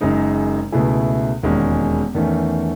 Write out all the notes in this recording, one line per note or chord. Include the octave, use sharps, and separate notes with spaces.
F#1 F#2 C#3 G#3 D#4
C#2 B2 A3 E4 G#4
E1 D#2 D#3 G#3 C#4
E2 D#3 A3 C#4